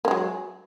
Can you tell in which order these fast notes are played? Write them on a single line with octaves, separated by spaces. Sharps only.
A#3 G#3 F#3